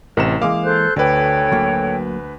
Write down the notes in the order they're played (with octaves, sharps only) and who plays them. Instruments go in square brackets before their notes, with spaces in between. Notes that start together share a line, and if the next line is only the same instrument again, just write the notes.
[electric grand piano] A1 C3 E7 [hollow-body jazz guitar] A#4 F#5 A#5
[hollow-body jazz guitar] E3 G#3 A#3 [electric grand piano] F5 D6
[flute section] A4 C5 F#6
[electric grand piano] D2 B4 [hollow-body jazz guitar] D3 D5 [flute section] A4 C#5 G5
[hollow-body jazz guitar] F#3 A#3